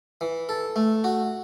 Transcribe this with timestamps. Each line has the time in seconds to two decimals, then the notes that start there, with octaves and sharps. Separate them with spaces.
0.21 E3
0.49 A4
0.76 A3
1.04 F#4